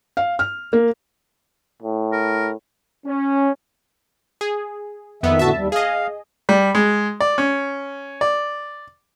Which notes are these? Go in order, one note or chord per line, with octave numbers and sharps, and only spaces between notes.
F5
F6
A#3
A2
A#4
C#4
G#4
F2 D#3 B3 E5
A2 D3 F#4 E5 A5
D#2 G3
G#4 D#5 F5
G3
G#3
D5
C#4
D5